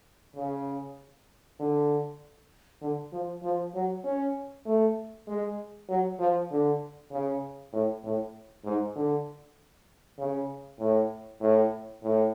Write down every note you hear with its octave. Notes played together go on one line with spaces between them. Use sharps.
C#3
D3
D3
F3
F3
F#3
C#4
A3
G#3
F#3
F3
D3
C#3
A2
A2
G#2
D3
C#3
A2
A2
A2